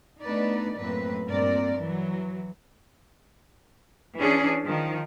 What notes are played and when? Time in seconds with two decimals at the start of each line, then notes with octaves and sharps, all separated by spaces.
0.22 A3 B3 D4 D#4 B4 D5
0.77 F#2 A2 A#3 C4 B4
1.26 G2 A#2 C4 A#4 D5
1.76 E3 F#3
4.17 E3 C#4 D4 G#4
4.64 D#3 F3